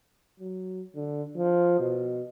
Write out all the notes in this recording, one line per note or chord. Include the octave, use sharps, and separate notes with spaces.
F#3
D3
F3
B2